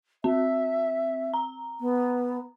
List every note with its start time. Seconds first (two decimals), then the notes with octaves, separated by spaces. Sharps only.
0.24 C4 E5
1.34 A#5
1.81 B3